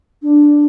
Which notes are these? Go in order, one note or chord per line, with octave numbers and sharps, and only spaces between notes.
D4